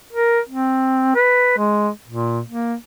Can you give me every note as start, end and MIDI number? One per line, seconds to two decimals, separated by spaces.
0.13 0.40 70
0.49 1.13 60
1.15 1.56 71
1.58 1.89 56
2.08 2.41 46
2.49 2.74 58